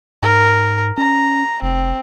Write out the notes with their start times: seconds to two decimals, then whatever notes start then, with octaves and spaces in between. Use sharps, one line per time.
0.23 G#2 A#4
0.98 C#4 A#5
1.62 F1 C4